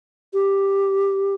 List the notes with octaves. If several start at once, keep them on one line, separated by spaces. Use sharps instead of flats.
G4